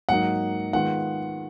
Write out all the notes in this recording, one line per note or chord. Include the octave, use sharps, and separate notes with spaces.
G#2 F#3 A#3 D#4 F#5
D#3 G#3 B3 F4 F#5